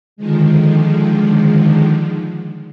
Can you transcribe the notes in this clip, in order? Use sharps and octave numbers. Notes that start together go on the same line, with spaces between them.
D3 D#3 F3 G#3